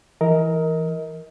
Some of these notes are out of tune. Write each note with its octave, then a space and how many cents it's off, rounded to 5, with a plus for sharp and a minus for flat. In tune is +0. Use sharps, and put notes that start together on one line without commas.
E3 +0 A#4 +0 D#5 +30